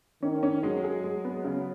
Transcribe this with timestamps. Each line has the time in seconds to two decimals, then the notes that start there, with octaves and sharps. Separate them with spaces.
0.23 D#3 C#4
0.43 C#4
0.63 F#3 G#3
0.84 G#4
1.04 G#3
1.25 B3
1.45 C#3